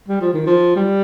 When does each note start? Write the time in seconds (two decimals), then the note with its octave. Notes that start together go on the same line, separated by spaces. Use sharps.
0.08 G3
0.21 F3
0.34 D#3
0.46 F3
0.76 G3